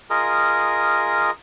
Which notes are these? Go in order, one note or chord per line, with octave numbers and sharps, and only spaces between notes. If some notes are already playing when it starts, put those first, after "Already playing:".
F4 G#4 A#4 D#5